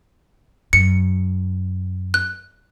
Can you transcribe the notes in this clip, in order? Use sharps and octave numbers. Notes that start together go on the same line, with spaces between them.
F#2 C#7
F#6